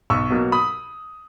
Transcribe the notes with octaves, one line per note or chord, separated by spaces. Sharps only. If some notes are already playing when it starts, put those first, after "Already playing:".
B1 C#6 E6
B2 F#3 A#3
B5 D#6